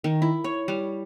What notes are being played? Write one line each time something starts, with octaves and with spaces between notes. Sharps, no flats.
D#3
E4
C#5
G3